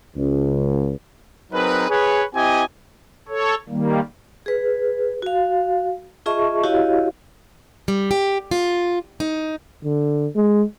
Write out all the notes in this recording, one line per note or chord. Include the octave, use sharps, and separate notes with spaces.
C#2
F#3 C4 D#4 G#4 A#4 B4
G#4 B4 C#5
C4 E4 G4 D#5 G#5
A4 C#5
D#3 G3 A#3
G#4 B4
F#4 F5
F4 G#4 D#5 E5 A5 C#6
E4 F#4 G4 C#5 D#5 F5
G3
G4
F4
D#4
D3
G#3